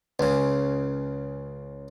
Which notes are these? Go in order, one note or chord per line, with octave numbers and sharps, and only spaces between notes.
C#2 C#3